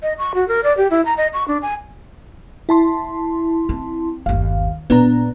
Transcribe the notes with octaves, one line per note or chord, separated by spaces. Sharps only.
D#5
C#6
F#4
A#4
D5
G4
E4
A#5
D#5
C#6
D4
G#5
E4 A5 C6
C4
G1 D#2 F5
A#2 B3 D4 A#5